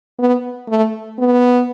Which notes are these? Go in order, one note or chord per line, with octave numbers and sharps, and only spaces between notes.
B3
A3
B3